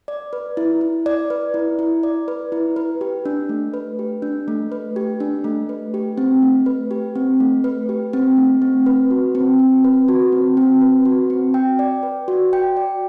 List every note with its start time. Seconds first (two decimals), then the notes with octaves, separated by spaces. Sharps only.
0.08 D5
0.33 B4
0.57 E4
0.81 E4
1.06 D5
1.30 B4
1.54 E4
1.79 E4
2.03 D5
2.28 B4
2.52 E4
2.76 B4
3.01 G4
3.25 D4
3.49 A3
3.74 B4
3.99 G4
4.22 D4
4.48 A3
4.72 B4
4.96 G4
5.20 D4
5.44 A3
5.69 B4
5.94 G4
6.18 C4
6.43 A3
6.66 B4
6.91 G4
7.15 C4
7.40 A3
7.64 B4
7.89 G4
8.13 C4
8.37 A3
8.62 C4
8.86 B4
9.11 F#4
9.35 C4
9.59 C4
9.84 B4
10.08 F#4
10.32 C4
10.57 C4
10.81 B4
11.05 F#4
11.30 C4
11.54 G5
11.79 D5
12.03 B4
12.28 F#4
12.53 G5
12.77 D5